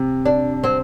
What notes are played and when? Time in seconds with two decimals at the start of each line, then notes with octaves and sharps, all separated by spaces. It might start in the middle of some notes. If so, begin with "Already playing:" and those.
Already playing: C3
0.25 D4
0.64 C4